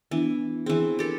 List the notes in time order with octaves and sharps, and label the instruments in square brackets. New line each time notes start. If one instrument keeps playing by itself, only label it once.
[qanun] E3 [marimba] B3 D4 E4
[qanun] E3 C4 [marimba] G#4 C5
[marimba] D4 A#4 [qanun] G4 A4